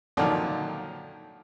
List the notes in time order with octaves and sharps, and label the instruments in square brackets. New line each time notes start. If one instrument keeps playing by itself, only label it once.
[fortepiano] A#2 D3 D#3 F3 F#3